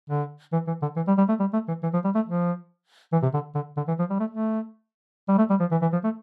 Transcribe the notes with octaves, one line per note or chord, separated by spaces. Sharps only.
D3
E3
E3
D3
E3
G3
G3
A3
G3
A3
E3
E3
F3
G3
A3
F3
E3
C3
D3
D3
D3
E3
F3
G3
A3
A3
G3
A3
G3
F3
E3
E3
F3
A3